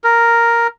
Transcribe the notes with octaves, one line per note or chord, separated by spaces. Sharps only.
A#4